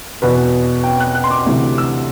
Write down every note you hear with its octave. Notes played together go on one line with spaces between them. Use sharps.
E2 B2 B4
G5
F#6
F#6
C6
D6
D2 C3 E3
E6